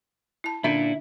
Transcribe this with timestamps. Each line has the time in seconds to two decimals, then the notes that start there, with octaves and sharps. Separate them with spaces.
0.44 E4 A5
0.64 A#2 D3 C#4 D4 E4 E5